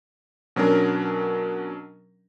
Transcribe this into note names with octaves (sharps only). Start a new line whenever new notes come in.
B2 F#3 C#4 D4 A#4